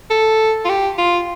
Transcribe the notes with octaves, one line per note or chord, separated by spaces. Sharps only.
A4
F4
G4
F4